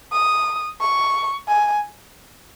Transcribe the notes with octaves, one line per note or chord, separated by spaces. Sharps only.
D#6
C#6
G#5